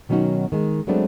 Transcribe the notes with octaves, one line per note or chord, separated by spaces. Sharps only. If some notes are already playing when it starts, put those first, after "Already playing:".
B2 D#3 F#3 C#4 D#4 F#4
D#3 G#3
F#3 G#3 A3 B3 C4 D4